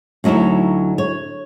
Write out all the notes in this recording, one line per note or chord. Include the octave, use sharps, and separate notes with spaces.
D2 F#3 D#4 E4 C#5
C#5